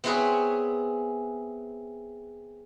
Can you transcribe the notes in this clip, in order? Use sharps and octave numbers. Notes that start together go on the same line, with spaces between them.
B3 C4 E4 G#4 B4 C#5